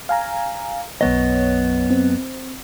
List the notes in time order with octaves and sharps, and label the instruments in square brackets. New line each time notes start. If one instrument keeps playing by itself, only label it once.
[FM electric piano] F5 G#5 A#5
[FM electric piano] B1 C#5 [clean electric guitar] F#2 B3 D#5
[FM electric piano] C4